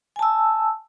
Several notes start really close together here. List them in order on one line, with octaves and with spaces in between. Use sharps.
G#5 A5 E6